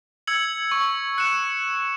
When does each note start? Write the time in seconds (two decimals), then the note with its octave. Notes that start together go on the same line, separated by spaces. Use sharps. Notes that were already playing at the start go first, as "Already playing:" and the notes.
0.27 E6 G#6 C#7 F#7
0.72 C#6
1.18 F#6 C#7 E7